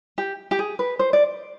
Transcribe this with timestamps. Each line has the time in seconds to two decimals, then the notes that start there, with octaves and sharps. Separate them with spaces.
0.18 G4
0.51 G4
0.59 G#4
0.79 B4
0.99 C5
1.13 D5